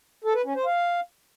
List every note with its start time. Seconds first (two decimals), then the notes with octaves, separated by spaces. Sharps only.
0.24 A4
0.35 B4
0.45 C#4
0.55 C5
0.65 F5